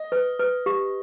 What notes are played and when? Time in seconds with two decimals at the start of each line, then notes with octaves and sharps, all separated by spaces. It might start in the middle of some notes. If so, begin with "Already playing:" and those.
Already playing: D#5
0.12 B4
0.39 B4
0.66 G4